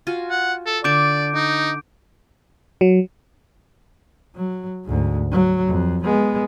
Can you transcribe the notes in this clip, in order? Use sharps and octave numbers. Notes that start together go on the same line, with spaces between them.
F4 F#4 G#5
F#5
A4
D3 D5 A5 D6 G6 D7
D#4
F#3
F#3
D2 G#2
F#3
F2
G#3 B3